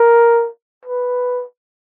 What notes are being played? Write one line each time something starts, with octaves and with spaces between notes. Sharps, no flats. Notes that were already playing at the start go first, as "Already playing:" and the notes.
Already playing: A#4
B4